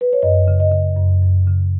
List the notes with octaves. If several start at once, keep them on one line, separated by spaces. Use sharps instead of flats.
B4
C#5
F#2 D#5
C#3
D#5
C#3
F#2
F#2
C#3